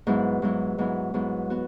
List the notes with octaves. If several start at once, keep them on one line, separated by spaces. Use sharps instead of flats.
G#2 F#3 B3 E4
G#2 F#3 B3 E4
G#2 F#3 B3 E4
G#2 F#3 B3 E4
B3 F#4